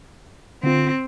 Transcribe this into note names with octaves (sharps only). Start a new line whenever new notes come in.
D3 C4 F4